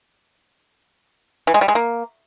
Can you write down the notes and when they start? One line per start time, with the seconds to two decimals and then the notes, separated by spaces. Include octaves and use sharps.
1.47 E3
1.54 G#3
1.61 G3
1.68 G#3
1.75 A#3